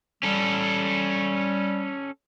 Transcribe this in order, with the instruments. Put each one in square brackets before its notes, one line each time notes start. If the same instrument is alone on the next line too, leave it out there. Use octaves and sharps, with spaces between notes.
[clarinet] G3 [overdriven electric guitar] C#4 A4